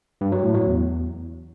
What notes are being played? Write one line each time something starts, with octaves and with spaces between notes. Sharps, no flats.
G2
F#3
A2
F#3
E2